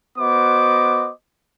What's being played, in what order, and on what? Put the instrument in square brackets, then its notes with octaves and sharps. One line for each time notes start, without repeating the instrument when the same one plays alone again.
[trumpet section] B3 F#4 C5 D#5 D6